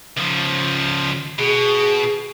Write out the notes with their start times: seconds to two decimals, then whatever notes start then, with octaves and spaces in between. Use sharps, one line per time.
0.17 C#2 F3
1.39 B2 G#4